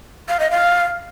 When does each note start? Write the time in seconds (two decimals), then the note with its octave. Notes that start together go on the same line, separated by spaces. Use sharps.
0.29 F5
0.40 D#5
0.51 F5